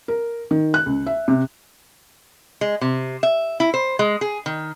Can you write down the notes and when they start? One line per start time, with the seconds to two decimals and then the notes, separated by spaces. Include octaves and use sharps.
0.08 A#4
0.51 D#3
0.74 F#6
0.86 C#2
1.07 E5
1.28 C3
2.61 G#3
2.81 C3
3.23 E5
3.60 E4
3.74 C5
3.99 G#3
4.21 G#4
4.46 D#3